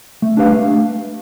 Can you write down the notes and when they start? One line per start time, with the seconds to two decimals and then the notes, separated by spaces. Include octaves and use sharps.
0.22 A3
0.37 D4 G4 B4 F5
0.52 A3